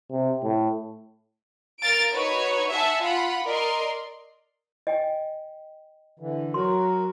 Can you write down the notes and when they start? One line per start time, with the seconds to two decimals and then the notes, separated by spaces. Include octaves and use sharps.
0.11 C3
0.43 A2
1.81 A#4 F5 A6 D7
2.12 D#4 F#4 B4 C#5
2.71 E5 F#5 G#5 A5
3.01 F4 F#5 B5
3.46 A#4 D5 D#5 C6
4.87 D#5 G5 G#5
6.19 D3 E3
6.54 F#3 F#4 A#4 C6